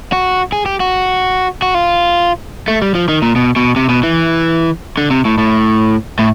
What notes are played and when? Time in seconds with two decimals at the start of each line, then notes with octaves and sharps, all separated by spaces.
0.12 F#4
0.52 G#4
0.66 G4
0.80 F#4
1.62 F#4
1.74 F4
2.68 A3
2.82 G3
2.95 F3
3.08 D#3
3.22 A#2
3.36 B2
3.56 B2
3.76 C3
3.89 B2
4.03 E3
4.98 D3
5.11 C3
5.25 A2
5.38 A2
6.19 A2